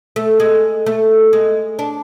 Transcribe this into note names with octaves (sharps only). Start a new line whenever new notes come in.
A3
G#3
A3
G#3
D4